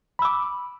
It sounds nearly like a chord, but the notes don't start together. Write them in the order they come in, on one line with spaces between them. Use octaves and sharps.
B5 E6 D6